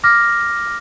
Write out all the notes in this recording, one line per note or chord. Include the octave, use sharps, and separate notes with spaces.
D6 F6 A#6